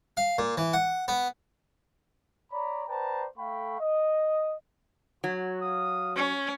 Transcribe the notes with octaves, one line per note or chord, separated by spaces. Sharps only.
F5
A#2
E3
F#5
B3
C#5 D5 A#5 B5
B4 C5 D5 G5 A5 A#5
A3 A4 F5 G5 B5 C#6
D#5
F#3 F#4
F5 D#6
C#4 C#5